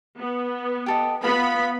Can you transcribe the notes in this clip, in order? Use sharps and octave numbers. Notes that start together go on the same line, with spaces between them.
B3
G4 A4 D#5
B3 F4 F5 B5